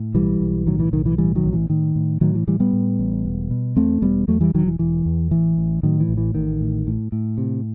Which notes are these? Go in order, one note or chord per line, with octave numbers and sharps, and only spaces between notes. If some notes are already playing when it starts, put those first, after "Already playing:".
Already playing: A2
B1 E3 G3
B1
A2 D#3 F#3
E3
B1 D#3
E3
A2 E3 G3
D#3 F#3
A1
E3
A2 D#3
A2
A2 D#3 F#3
E3
A2 E3 G3
G3 B3
A2
A1
E1
B2
E2 A3 C4
E1 G3 B3
E2 F#3 A3
E3 G3
E1 D#3 F#3
E3
E1 E3
E2
A1 E3
A1
A2 D#3 F#3
E3
A1
E3
A1 D#3
A2
A2
A2
C3